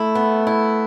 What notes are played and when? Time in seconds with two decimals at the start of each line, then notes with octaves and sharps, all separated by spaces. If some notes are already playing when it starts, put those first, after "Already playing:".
Already playing: A3 E4
0.15 B3
0.47 E4